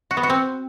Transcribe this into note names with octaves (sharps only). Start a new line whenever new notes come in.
F#4
B3
F#4
C4